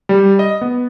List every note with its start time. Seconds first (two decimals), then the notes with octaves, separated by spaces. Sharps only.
0.09 G3
0.39 D#5
0.61 B3